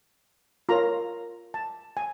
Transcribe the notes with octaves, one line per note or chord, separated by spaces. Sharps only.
F4 A#4 C#5 A#5
A5
G#5